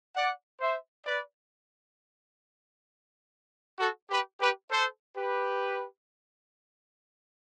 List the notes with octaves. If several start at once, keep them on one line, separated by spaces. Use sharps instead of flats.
D5 F#5
C5 E5
B4 D5
F#4 A4
G4 B4
G4 B4
A4 C5
G4 B4